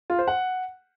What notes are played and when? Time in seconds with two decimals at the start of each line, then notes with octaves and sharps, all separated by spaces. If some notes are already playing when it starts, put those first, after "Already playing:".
0.10 F4
0.19 C5
0.28 F#5